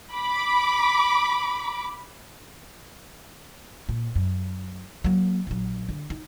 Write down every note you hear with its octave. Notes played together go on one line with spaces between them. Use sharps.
B5 D6
A#2
F#2
F#3 A#3
A#1 F#3
D3
D#4